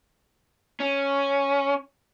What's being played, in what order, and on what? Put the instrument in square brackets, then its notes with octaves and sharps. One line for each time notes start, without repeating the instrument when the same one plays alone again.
[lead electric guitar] C#4